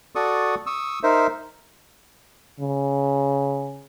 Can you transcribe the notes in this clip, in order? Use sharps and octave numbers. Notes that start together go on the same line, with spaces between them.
F#4 A4 D5 C#6 D#6
C#6 D#6 E6
D#4 A#4 C5 E5
C#3